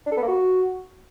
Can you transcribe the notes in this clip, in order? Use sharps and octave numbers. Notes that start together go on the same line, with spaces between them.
D4
A4
B3
A#3
F#4